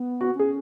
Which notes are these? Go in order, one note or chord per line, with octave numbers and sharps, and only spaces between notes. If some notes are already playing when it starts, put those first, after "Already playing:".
Already playing: B3
F#4
C#4 G#4